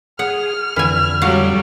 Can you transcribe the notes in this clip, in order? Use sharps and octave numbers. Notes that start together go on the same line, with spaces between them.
G#4 F#5 F6
F2 D3 E3 G#5
F#3 G3 F#4 F5